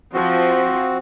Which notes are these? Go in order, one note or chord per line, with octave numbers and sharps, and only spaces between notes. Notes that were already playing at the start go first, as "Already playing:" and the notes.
F3 C4 F#4